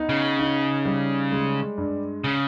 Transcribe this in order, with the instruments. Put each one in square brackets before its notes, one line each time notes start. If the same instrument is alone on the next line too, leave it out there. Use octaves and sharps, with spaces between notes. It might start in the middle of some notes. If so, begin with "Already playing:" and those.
Already playing: [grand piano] B3 D#4
[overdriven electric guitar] C#3
[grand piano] D#4
G3
G#3
G2
[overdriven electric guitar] C#3